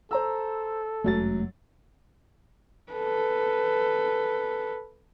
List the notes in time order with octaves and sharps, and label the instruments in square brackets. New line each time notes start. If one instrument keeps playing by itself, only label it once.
[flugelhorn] A4 [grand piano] C5 A#5 E6
[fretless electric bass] F1 G#3 A3 [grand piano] F#2 F#3 A6
[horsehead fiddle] A4 B4